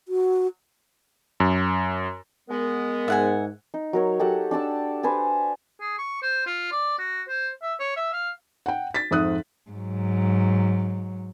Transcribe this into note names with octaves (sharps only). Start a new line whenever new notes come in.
F#4
F#2
G#3 B3 A#4
G#2 E5 F#5 G#5
D#4
F#3 A#4 C#5
G4 A4 F#5
D4 D5 A5 E6
B4 C5 G#5 A5
G#4
C#6
C5
F4
D5
F#4
C5
E5
C#5
E5
F5
F#5 G5
A6 B6
F2 G#2 E5 D#6 F#6
G#2 F#3